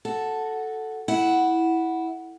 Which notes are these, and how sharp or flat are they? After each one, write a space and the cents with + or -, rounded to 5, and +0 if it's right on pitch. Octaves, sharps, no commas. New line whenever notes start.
F#4 +0 A4 +0
E4 -10 F#5 +0